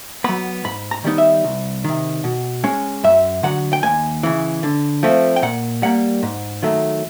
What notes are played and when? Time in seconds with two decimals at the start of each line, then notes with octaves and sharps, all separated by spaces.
0.24 F#3 B3 B5
0.65 G#2 B5
0.91 A#5
1.04 D#3 G3 B3 D#4
1.18 E5
1.44 C2
1.84 C3 D#3
2.24 B2
2.64 G#3 C#4
3.04 F#2 E5
3.43 D3 F#3 F#5
3.73 G5
3.83 D#2 G#5
4.23 C#3 E3
4.63 D3
5.03 F3 A3 C4
5.36 G5
5.42 A#2 F#5
5.82 G3 A#3 F#5
6.23 G#2
6.62 D#3 F#3 A3